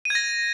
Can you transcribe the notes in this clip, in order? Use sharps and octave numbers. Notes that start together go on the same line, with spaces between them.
G#6 A#6 D#7